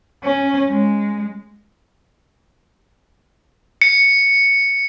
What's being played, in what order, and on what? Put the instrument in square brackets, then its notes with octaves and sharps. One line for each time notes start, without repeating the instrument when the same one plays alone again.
[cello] C#4
G#3
[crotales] C#7